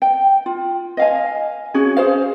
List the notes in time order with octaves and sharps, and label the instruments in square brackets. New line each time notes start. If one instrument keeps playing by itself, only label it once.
[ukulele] G5
F4
D#5 F5 G#5
C#4 F#4 G#4
G#4 C5 F5